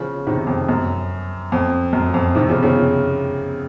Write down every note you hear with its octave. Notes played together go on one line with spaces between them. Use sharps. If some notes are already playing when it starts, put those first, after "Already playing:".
Already playing: C#3 F3
C3 D#3
F2
F#2
F2
F#2
F2
C3 D#3
C#3 F3
C#3 F3